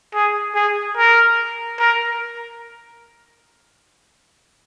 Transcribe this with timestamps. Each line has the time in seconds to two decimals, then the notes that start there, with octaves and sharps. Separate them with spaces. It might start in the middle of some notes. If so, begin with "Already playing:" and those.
0.14 G#4
0.55 G#4
0.97 A#4
1.79 A#4